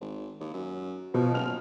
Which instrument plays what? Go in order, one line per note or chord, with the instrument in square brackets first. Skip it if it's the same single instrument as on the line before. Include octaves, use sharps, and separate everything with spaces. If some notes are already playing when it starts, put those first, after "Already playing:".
[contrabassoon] G#1
D#2
F#2
[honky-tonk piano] B2 [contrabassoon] F3
[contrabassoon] F#1 [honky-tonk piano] F6 F7